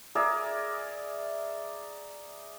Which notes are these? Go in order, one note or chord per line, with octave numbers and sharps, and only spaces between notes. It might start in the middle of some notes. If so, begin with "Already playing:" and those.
G#4 A#4 D5 E5